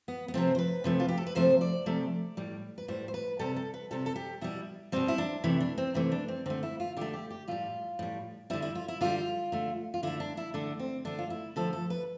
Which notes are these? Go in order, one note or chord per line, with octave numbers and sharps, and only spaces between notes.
B3
B3
C3 F3 A3 C4
C5
B4
C3 F3 A3
F4
G4
A4
B4
C3 F3 A3 C5
D5
C3 F3 A3
A2 G3
B4
A2 G3 C5
C5
B4
C3 G3 A4
A4
B4
C3 G3 A4
A4
G4
B2 G3 E4
B2 G3 C4
E4
D4
C3 E3 A3 E4
D4
C4
C3 E3 A3 C4
D4
C4
D3 A3 C4
E4
F4
D3 A3 G4
G4
G4
A2 G3 F4
A2 G3
D3 G3 E4
E4
F4
E4
D3 G3 F4
D3 A3
F4
D3 A3 E4
D4
E4
D3 A3 D4
C4
D3 A3 D4
F4
E4
D3 F3 A3 A4
A4
B4